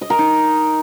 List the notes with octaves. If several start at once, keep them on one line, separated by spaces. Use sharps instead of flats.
D#5
A#4
D#4